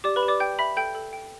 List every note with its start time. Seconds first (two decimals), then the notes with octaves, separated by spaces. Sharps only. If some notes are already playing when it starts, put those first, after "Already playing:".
0.04 G4 D5 D6
0.16 B4 B5
0.23 G4
0.28 D5 D6
0.40 G5 G6
0.59 E5 B5 B6
0.77 A4 G5 G6
0.95 A4
1.13 G5